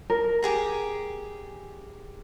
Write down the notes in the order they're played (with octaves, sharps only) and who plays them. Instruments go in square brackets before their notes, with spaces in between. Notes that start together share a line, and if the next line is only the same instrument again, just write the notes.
[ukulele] A#4
[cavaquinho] G4 G#4 A#5